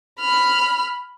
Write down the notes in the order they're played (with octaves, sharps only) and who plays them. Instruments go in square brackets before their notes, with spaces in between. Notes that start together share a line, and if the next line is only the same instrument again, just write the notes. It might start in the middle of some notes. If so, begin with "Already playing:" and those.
[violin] B5 F6